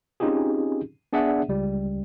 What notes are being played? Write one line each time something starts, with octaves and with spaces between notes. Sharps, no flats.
C4 C#4 D#4 F4 G4 G#4
B3 D4 G#4 D5 E5 F#5
C#2 G3